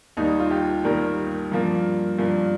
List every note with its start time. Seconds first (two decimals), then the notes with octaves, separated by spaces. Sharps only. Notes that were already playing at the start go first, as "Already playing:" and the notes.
0.17 D#2 D#3 G3 D#4
0.40 F4
0.51 G4
0.84 D#2 D#3 G3 A#4
1.52 G2 F3 A#3
2.18 G2 F3 A#3